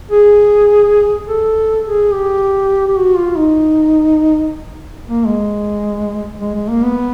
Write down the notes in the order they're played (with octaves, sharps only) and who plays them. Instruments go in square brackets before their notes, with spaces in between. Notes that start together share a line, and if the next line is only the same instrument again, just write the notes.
[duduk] G#4
A4
G#4
G4
G4
F#4
F4
D#4
A#3
G#3
G#3
G#3
A#3
B3